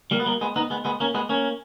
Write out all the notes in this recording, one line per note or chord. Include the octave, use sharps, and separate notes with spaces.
G3 A#3
B3
G3 A#3
G#3 B3
B3 D#4
G#3 B3
G#3 B3
A#3 C#4
G#3 B3
A#3 C#4